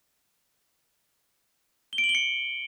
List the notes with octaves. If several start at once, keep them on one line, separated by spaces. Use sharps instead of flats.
G7
D7
F#7
G7
C#7